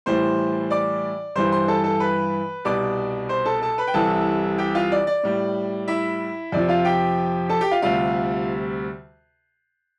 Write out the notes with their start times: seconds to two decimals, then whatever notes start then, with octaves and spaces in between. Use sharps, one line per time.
0.06 A2 E3 G3 C5 C6
0.70 D5 D6
1.35 G2 E3 G3 C5 C6
1.52 C5 C6
1.68 A4 A5
1.84 A4 A5
2.00 B4 B5
2.65 C2 B2 G3 D5 D6
3.29 C5 C6
3.45 A4 A5
3.61 A4 A5
3.78 B4 B5
3.88 G5
3.94 C2 C3 E3 G3 A4 A5
4.58 G4 G5
4.75 F4 F5
4.92 D5
5.07 D5
5.23 A2 G3
5.88 E4 E5
6.52 F2 C3 F3 D5
6.68 F4 F5
6.85 G4 G5
7.49 A4 A5
7.61 G4 G5
7.71 F4 F5
7.82 D2 C3 G3 F4 F5